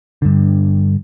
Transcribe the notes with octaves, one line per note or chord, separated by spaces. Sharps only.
G2 D3